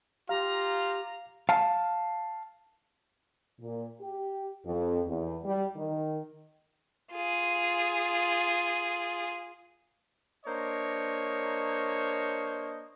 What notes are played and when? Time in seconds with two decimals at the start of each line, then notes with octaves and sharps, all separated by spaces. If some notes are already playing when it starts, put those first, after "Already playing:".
0.29 F4 G4 F5 A#5
1.49 F5 A5
3.60 A#2
4.01 G4
4.65 F2
5.08 E2
5.44 G3
5.75 D#3
7.14 F4 G#4
10.46 A#3 D4 C5 C#5 D#5